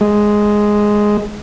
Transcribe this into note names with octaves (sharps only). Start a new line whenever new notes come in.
G#3